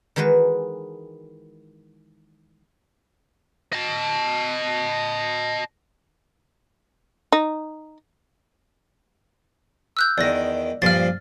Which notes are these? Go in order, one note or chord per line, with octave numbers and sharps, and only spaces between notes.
D#3 E3 G#3 F#4 B4
D#5 A5
D#4
E6 F#6 G6
E2 D#3 D5 A#6
G2 A#2 F3 F6 A6